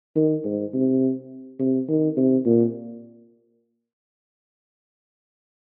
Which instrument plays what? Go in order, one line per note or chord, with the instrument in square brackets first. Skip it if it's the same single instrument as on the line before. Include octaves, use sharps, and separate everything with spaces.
[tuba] D#3
G#2
C3
C3
D#3
C3
A#2